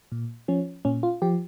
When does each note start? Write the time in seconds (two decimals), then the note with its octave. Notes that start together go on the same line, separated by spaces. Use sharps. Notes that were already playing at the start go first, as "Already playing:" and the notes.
0.12 A#2
0.48 F3 C#4
0.85 A#2 C#4
1.03 F4
1.22 F3 G4